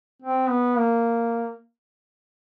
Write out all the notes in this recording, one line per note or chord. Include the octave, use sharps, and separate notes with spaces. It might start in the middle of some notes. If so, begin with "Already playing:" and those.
C4
B3
A#3